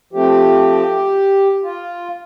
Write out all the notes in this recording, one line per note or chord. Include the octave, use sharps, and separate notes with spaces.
F3 A3 C4 G4
F4